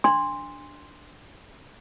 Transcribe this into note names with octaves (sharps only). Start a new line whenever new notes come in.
D4 C6